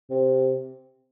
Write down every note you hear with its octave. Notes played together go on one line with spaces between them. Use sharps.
C3